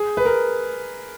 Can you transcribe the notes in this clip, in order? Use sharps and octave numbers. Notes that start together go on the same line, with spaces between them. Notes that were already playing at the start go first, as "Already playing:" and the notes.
Already playing: G#4
B4
A#4